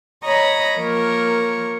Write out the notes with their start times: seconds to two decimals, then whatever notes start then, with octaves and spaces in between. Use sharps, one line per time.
0.24 C#5 D#5 A#5 B5
0.77 F3 A#3 A#4 C#5